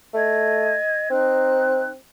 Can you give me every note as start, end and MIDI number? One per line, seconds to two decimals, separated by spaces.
0.14 0.75 57
0.14 1.09 75
0.14 1.09 92
1.10 1.96 60
1.10 1.87 63
1.10 1.87 72
1.10 1.87 90